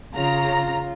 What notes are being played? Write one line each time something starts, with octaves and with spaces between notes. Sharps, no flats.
C#3 F4 A#5